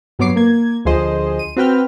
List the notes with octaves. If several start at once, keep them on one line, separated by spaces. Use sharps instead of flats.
G2 F#3 B3 C#5 D6 C7
A#3 G#6
D2 F3 G#4 C5 D#5
D#7
C4 F#4 B4 G5 F6